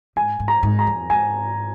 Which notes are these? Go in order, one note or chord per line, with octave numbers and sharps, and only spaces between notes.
G#2 G#5
G#2
A#5
G#2
A#5
F2
G#2 G#5